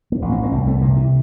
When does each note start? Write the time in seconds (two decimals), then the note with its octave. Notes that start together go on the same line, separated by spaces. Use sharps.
0.12 A#3
0.22 A1
0.32 C4
0.42 A#3
0.52 C2 C4
0.67 A3
0.81 C3 A#3
0.97 E3